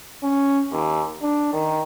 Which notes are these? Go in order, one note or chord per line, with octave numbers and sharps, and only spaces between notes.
C#4
D#2
D4
D#3